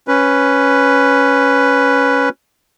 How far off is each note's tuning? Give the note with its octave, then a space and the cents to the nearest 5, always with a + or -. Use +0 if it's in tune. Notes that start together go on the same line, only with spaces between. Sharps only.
C#4 +0 B4 +0